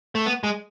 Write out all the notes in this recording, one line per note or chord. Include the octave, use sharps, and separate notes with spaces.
A3
B3
G#3